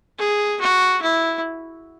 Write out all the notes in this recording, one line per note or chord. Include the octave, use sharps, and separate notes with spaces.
G#4
F#4
E4